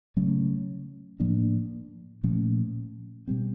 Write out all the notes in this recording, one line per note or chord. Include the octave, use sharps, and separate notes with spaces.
C#3 F#3 A3 C#4
A2 F3 A#3 D4
A#2 F3 A3 C#4
B2 G3 C4